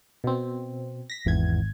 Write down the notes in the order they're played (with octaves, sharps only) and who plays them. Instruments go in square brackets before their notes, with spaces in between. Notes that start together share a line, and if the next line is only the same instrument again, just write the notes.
[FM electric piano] B2 C4
A#6 B6
[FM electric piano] G#1 G#6 [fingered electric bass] E2